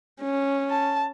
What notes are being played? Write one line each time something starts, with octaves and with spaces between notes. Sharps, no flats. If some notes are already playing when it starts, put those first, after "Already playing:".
C#4
A5